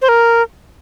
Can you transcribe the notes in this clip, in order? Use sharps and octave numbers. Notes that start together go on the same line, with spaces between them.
C5
A#4